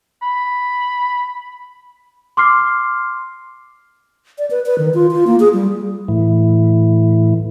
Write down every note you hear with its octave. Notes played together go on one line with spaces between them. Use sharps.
B5
C6 D6 F6 C7
D5
B4
B4
D#3
F4
F4
A#3
G#4
G3
A2 E3